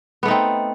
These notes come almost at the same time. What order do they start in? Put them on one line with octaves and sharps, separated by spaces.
B3 A3 D#4 C4